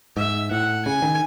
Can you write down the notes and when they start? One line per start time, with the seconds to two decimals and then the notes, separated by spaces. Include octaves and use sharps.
0.17 G#2 E5
0.51 A2 F#5
0.86 C#3 G#5
1.02 D#3